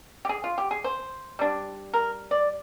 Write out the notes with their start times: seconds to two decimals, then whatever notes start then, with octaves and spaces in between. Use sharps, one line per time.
0.25 G4
0.29 G#4
0.44 F4
0.58 G4
0.71 G#4
0.84 C5
1.39 G3 D4
1.94 A#4
2.31 D5